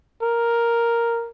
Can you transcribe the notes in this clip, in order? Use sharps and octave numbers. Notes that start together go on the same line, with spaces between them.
A#4